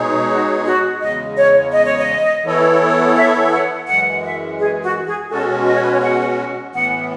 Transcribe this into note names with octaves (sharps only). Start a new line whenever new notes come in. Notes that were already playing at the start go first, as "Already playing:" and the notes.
Already playing: B2 G#3 D#4 G#4 C#5
F#4
F#4
E2 C#3 G#3 D#5
C#5
D#5
C#5
D#5
E3 B3 E4 A4 C#5
E5
F#5
F#2 E3 G#3 F#5
E5
G#4
F#4
G#4
B2 G#3 C#4 F#4 A4
D#5
C#5
B4
C#5
F#5
A2 E3 B3 F#5